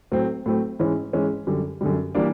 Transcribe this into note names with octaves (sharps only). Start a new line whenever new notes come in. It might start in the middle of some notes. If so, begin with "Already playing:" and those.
A2 F#3 A3 C4
A2 F#3 A3 C4
G#2 E3 G#3 C#4 E4
G#2 E3 G#3 C#4 E4
F#2 D3 G3
F#2 D3 G3
E3 G3 A#3 D4